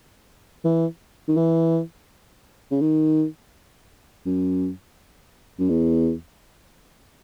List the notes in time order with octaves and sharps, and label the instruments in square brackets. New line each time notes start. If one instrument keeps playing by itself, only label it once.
[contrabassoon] E3
D#3
E3
C#3
D#3
F#2
F#2
E2